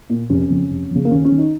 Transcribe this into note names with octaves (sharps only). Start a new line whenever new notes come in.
A#2
F1 C#4
F2 C#3
F1
F2 C#3
A#3
D#2 C#4
C#4
D#3
D#4